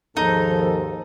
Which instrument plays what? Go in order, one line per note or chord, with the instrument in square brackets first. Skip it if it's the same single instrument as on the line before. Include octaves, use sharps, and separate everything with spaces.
[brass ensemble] D#2 G#2 [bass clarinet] F3 [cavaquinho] D#4 [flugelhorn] A4